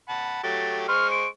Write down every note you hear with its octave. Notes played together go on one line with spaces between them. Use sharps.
F#5 A5 B5
F#3 A3 G4 A6
G#3 C5 C#6 F6
D7